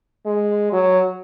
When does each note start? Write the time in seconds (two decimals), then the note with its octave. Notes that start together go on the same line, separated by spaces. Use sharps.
0.26 G#3
0.73 F#3